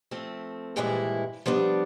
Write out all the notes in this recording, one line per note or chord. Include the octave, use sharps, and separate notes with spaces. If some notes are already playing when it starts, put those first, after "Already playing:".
F3 A3 C4
G2 A#2 E3 F3 G#3 E4
F3 G3 B3 D4